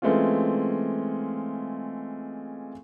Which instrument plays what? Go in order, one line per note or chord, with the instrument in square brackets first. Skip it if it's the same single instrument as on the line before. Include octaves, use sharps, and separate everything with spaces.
[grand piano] E3 G#3 A3 C4 C#4 F4